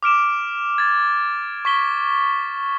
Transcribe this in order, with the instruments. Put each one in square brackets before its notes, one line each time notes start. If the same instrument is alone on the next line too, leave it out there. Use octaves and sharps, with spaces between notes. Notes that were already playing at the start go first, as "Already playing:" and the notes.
[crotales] D6 F6 D7 E7
G#6 A6
C#6 B6 G7